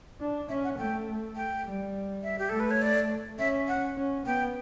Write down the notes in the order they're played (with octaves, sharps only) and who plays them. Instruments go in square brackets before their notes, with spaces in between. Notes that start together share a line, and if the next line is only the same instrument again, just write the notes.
[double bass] D4
[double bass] C#4 [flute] E5
[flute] F#5
[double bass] A3 [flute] G5
[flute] G5
[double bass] G3
[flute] E5
G4
[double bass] A3 [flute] A4
[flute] B4
C#5
D5
[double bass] C#4 [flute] E5
[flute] F#5
[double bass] C#4
[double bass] B3 [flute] G5